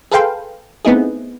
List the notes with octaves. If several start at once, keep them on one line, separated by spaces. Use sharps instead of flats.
G#4 A4 B4 F5 G5 C6
A3 B3 C4 D#4 E4 G#4